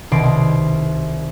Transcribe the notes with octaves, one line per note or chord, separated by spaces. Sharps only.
C2 B2 D#3 C6 D6 C7